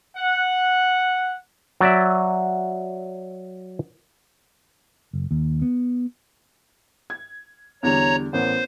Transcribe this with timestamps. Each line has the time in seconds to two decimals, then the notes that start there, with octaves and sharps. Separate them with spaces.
0.16 F#5
1.81 F#3 D5 E5
5.13 F#1
5.31 D#2
5.62 B3
7.10 G#6
7.83 E2 D3 G3 C#5 A#5
8.33 A1 B3 A#4 C5